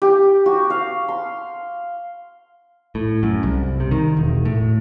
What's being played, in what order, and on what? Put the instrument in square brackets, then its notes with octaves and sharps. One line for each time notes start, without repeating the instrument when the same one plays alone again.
[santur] G4
F#4
F5
C6
[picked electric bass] A2
F#2
C2
C3
D#3
E1
A2